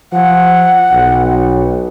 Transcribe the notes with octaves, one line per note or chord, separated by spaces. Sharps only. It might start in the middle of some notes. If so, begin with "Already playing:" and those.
F3 F#5
B1